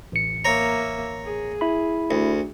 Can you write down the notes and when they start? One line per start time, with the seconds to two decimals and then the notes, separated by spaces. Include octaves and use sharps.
0.12 A1 C#7
0.45 A#3 C#5 E5 A#5
1.24 G#4
1.61 E4 B5
2.11 D2